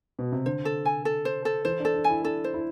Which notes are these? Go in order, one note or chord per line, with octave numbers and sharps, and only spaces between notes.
B2
C3
D3 C5
A4
G#5
A4
C5
A4
E3 C5
D4
A4
D4
G#5
E4
D4 A4
C5
E4